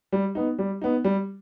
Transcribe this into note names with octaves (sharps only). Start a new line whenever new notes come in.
G3
B3 D#4
G3
B3 D#4
G3